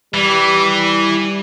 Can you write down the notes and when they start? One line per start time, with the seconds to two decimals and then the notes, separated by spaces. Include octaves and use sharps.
0.14 E3 G3